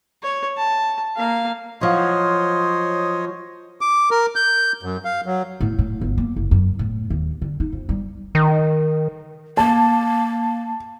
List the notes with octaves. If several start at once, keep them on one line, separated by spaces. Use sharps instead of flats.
C#5
A5
A#3 F5
F3 F#3 C5 C#5 D#5
D6
A#4
G6
F#2
F5
F#3
A2
A2
G1
A#3
F#1
F#2
A2
D#2
D3
D#4
F2
G3
D#3
A#3 A5